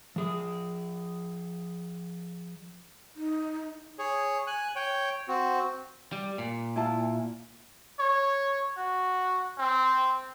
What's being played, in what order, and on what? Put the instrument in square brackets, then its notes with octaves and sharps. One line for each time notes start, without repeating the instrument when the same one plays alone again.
[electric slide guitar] F3 G#4
[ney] D#4
[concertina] G#4 C#5
G#5 F#6
C#5 G5
C4 F#4
[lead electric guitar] G3
A#2
[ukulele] E4 F4 A5
[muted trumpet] C#5
F#4
C4